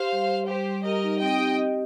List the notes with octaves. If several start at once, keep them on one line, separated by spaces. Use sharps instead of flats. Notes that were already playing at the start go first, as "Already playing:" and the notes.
Already playing: G4 C5 F5
G3
G3
G3 G4 C5
G3
G4 A#4 D#5
D#4
C4 D#5 G5
G4
D#5